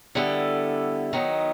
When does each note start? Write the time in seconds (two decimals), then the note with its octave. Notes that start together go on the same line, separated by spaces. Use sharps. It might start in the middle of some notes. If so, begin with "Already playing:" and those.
0.15 D3 G3 B3 E4 A4
1.13 D#3 F#3 B3 D#4